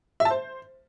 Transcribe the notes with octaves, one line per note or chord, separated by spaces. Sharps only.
E5
A5
C5